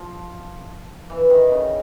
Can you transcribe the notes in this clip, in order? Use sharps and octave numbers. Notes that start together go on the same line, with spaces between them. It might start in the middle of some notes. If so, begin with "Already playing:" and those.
Already playing: F3
E3
D#3
C#3